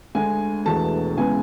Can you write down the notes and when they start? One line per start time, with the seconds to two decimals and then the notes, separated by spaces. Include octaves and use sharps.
0.15 D2 D3 G#3 G#5
0.65 E1 E2 B2 A3 A5
1.17 E2 C#3 G#3 B3 G#5